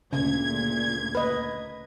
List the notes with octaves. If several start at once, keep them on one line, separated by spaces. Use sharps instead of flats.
D2 A#2 C#3 G#6
B4 D#5